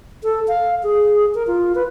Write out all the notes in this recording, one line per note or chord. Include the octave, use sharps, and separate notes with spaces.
A4
F5
G#4
A#4
F4
B4